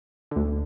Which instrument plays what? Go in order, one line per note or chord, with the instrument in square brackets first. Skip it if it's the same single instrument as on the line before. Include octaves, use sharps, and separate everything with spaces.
[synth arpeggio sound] D2 D3